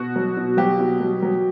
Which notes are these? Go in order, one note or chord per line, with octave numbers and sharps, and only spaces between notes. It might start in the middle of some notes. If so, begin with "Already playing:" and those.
Already playing: B2 F#4
F#3
B2
F#3 G4
B2
F#3
F#3